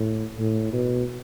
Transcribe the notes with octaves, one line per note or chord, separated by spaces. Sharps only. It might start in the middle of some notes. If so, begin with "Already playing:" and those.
Already playing: A2
A2
B2